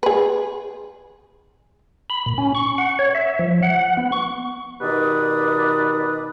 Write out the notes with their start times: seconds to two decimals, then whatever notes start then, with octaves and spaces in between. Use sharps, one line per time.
0.03 G#4 B4
2.10 B5
2.26 A#2
2.38 C#4
2.55 C#6
2.78 F#5
2.99 C#5
3.15 E5
3.39 F3
3.63 F#5
3.97 B3
4.12 C#6
4.81 B2 D#3 G4 B4 D5 D#6